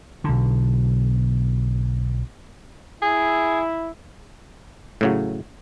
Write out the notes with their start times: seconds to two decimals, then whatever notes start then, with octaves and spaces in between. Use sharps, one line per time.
0.24 B1 D3
3.02 E4 G#4
5.01 A2 C#3 F#3